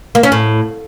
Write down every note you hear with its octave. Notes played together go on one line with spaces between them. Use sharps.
A#3
C#4
A2